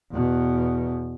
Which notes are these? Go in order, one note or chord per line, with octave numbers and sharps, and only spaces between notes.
E2 B2